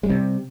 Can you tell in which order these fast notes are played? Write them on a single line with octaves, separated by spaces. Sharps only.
G#3 G3 C3